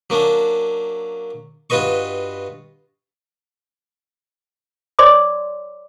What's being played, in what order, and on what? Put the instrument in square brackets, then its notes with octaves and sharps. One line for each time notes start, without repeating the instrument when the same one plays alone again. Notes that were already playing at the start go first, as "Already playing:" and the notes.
[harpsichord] F#3 A#3 C#4 D4
G2 F4 F#4 B4 D#5 C#6
[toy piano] C#5 D5 C6 D6